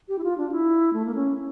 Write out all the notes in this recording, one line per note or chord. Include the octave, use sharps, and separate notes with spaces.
G4
E4
F4
D4
E4
A3
A#3
C#4